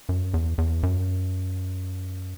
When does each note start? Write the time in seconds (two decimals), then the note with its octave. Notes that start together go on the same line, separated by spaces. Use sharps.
0.09 F#2
0.34 E2
0.58 E2
0.83 F#2